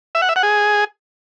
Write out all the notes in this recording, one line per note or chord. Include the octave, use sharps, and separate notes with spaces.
E5
F#5
E5
F#5
G#4